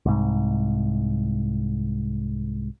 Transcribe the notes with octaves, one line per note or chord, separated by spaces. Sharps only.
C2 G#2